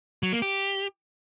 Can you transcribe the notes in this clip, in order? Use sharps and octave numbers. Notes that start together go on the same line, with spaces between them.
F#3
A#3
G4